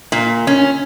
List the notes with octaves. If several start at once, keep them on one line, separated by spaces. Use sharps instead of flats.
A#2
C#4